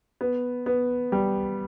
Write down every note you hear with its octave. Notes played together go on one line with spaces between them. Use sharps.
B3
B3
G3